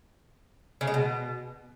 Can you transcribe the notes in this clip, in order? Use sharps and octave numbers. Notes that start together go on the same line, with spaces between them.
C#3
G#3
B2